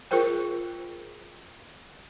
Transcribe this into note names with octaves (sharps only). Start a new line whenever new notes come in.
F4 G#4 A#4 C5 G5